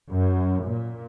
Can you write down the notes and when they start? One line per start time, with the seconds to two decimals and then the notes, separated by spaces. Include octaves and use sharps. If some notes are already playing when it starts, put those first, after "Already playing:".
0.11 F#2
0.66 A#2